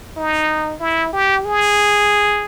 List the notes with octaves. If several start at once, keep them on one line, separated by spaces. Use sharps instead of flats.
D#4
E4
G4
G#4